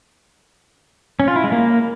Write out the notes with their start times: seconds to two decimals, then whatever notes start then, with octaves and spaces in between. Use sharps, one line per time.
1.20 C#4
1.28 F4
1.36 E4
1.44 G#3
1.52 A#3